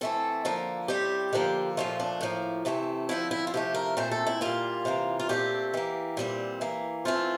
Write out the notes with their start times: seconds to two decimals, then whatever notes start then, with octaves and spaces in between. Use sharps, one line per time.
0.01 E3 A3 C4 A4
0.45 D3 F3 A#3
0.88 A2 G3 C4 G4
1.33 D3 F3 A#3
1.77 A#2 F3 A3 F4
2.00 D4
2.21 A2 F3 A#3
2.65 C3 E3 A3 C4
3.09 D3 F3 C4 E4
3.31 E4
3.47 F4
3.54 C3 F3 A3 G4
3.74 A#4
3.97 A#2 A3 C4 C5
4.11 A4
4.27 E4
4.41 A#2 G3 A#3 F4
4.85 C3 E3 A#3
5.19 F4
5.29 A#2 A3 C4 G4
5.74 E3 A#3
6.17 A#2 G3 C4
6.61 E3 A#3
7.05 E3 A3 C4 F4